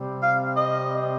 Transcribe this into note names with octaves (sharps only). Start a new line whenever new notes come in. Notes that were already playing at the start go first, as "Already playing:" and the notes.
Already playing: C3 G3 C4
F5
D#5